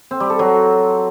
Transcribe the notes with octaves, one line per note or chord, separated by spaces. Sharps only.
C4
G3
A4
F#3